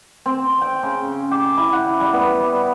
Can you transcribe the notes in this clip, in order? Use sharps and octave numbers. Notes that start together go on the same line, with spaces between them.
C4
G5
C#3
G4
E4
F#5
G3
B3
G3